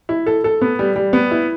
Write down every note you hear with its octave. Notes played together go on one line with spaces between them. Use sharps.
E4
A4
A4
B3
G3
G3
B3
E4